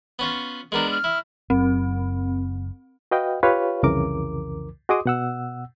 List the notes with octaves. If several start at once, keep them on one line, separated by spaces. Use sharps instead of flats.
B3 C#4 F4
G#3 B3 D4 A#4
F6
E4
F#1 F#2 C4
F#4 B4 D#5 F5 G5
F4 G4 B4 C#5 F5
C2 F2 C#3 E3 A#4 D6
F#4 G#4 D#5 C6 D6 D#6
B2 F#5 E6